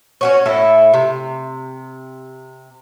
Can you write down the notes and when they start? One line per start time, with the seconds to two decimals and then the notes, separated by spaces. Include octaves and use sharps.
0.21 C#4 F#4 C#5
0.46 A2 E4 A4
0.94 C3